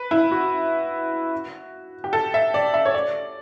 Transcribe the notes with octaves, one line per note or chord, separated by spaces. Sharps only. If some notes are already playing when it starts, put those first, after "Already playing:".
Already playing: B4
E4
F#4
G4
A4
E5
D5
E5
C#5
D5